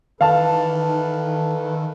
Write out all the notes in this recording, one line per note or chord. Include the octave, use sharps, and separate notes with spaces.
D#3 E3 A4 B4 F5 A5